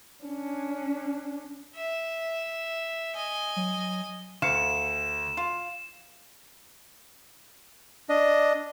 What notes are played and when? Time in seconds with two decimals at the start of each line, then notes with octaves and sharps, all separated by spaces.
0.24 C#4 D4
1.76 E5
3.16 D#5 G#5
3.56 F#3
4.42 D2 F5 C#7 E7
5.37 F4 F5
8.09 D4 D#5